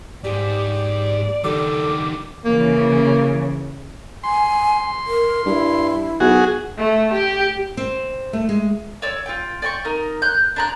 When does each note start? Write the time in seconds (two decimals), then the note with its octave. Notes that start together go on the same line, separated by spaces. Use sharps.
0.24 G#2 G4 D5
1.44 D#3 G3 D4 A4 D6
2.45 C#3 E3 A#3
4.24 G#5 C6
5.07 A#4
5.46 G2 E4
6.20 B1 F#4 G#4
6.78 A3
7.13 G4
7.77 C4
8.33 A3
8.49 G#3
9.02 C#5 D5 E6
9.26 F4 G5
9.62 D5 G5 A#5 C#6
9.85 D#4 A#4
10.22 F#6 G6
10.56 D4 A#5 F#6